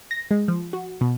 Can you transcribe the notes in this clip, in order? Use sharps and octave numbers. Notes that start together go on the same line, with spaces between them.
A#6
G#3
F3
F#4
B2